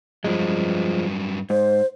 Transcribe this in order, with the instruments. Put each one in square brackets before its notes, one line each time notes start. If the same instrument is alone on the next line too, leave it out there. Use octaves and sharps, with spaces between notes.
[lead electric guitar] G2 F#3 [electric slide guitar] F3 G#3
[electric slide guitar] G#2 [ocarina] C5